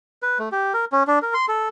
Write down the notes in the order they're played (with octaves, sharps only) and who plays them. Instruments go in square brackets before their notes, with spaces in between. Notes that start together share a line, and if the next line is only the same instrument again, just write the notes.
[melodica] B4
A3
G4
A#4
C#4
D4
A#4
C6
A4